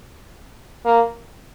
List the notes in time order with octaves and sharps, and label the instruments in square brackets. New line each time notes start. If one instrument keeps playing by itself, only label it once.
[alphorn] A#3